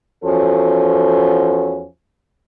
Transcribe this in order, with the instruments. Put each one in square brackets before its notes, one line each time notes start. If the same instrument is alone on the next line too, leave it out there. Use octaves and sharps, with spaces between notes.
[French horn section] E2 F3 C#4 F#4 A4